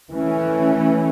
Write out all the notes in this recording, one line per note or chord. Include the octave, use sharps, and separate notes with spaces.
E3 A3 C#4